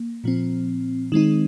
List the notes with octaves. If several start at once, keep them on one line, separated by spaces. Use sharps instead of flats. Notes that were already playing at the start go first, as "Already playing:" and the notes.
Already playing: A#3
A#2 F3 C4
D#3 G#3 C4 D#4